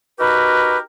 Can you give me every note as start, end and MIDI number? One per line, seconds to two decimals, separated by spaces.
0.19 0.79 63
0.19 0.79 66
0.19 0.79 67
0.19 0.79 70
0.19 0.79 71